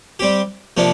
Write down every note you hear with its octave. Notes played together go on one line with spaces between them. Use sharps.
G3 C4 G4
C3 F3 A#3 D4